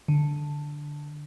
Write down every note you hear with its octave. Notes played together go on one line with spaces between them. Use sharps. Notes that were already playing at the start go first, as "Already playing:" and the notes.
D3